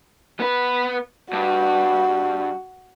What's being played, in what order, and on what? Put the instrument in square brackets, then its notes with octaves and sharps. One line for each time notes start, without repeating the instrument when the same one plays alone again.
[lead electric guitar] B3 B4
[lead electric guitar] G2 [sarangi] F#4